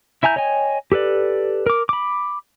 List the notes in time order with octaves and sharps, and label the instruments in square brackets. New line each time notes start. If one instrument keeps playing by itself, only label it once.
[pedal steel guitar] E4 E5 G#5 A#5 G6
C#5 D#5 G5 G#5
G4 A4 B4 D5
A#4 D6
B5 D6